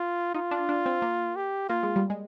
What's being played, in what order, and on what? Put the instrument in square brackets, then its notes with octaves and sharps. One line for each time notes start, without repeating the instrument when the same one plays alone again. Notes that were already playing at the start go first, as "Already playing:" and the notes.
Already playing: [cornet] F4
[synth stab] D#4 [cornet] F4
[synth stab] D4
D4
C4
A#3
[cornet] G4
[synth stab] A#3 [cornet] F4
[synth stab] G#3
G3
G#3